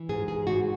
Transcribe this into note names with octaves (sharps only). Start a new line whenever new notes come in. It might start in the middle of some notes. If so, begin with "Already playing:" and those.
Already playing: E3
G#2 G#4
G#4
G#2 F#4